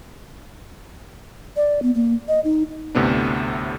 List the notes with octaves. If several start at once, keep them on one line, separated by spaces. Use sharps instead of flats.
D5
B3
A#3
D#5
D#4
D2 A2 C3 B3 D4